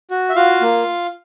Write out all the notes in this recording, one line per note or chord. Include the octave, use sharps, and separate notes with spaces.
F#4
E5
F4 F#4 F5
A#3